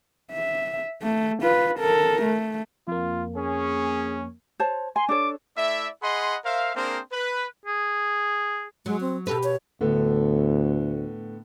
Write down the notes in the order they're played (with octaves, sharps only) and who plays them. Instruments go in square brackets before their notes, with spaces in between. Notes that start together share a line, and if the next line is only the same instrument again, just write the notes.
[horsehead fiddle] E5
A3
F4 B4
A4 A#4
A3
[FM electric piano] F2 A#3 [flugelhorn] F4
[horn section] C#4 [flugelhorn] G#4
[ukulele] C5 C#5 A5
[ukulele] G#5 [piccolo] C6
[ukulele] D4 A4 C#5 [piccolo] D6
[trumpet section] A3 E4 D5 E5
G#4 D#5 F#5 B5 C6
A#4 C5 E5 F5
A#3 C4 D4 G#4 A#4 C5
B4
[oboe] G#4
[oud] F#3 [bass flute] G#3
[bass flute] C4
[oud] B2 G4 B4 [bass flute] A4
[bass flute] C#5
[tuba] D2 [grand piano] A2 D3 B3